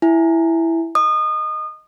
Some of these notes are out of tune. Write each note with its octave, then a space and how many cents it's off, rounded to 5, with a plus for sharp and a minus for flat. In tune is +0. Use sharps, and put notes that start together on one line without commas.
E4 +0 G#5 +0
D#5 +0 D#6 -30